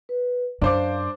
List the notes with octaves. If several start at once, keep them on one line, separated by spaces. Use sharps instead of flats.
B4
F#2 D4 C5 F5 D6